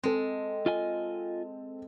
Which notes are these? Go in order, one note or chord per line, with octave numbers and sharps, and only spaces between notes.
G#3 C4 A4
F4 D#5 G#5